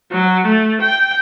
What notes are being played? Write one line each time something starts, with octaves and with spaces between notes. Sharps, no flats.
F#3
A3
G5